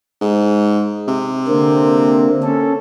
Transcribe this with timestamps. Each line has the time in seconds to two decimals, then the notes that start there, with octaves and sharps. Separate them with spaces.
0.21 G#2
1.08 C3
1.48 D3 A#3 C4
2.43 C#4 A4